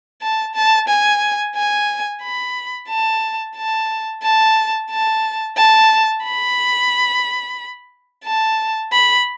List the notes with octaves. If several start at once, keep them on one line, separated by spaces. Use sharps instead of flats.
A5
A5
G#5
G#5
B5
A5
A5
A5
A5
A5
B5
A5
B5